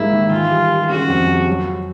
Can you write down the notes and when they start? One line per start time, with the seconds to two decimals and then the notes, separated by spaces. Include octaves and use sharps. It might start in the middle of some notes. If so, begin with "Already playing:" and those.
Already playing: G#2 G3 A#3 E4
0.13 D#3
0.31 E3 F4
0.51 G3
0.71 G3
0.89 C#3 F#4
1.09 F2
1.28 G3
1.47 F#3